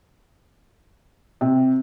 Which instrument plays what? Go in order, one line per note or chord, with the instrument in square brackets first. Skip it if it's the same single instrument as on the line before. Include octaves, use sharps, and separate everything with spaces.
[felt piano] C3